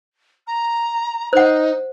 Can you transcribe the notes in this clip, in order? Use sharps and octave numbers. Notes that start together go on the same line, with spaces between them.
A#5
D#4 C5 F#5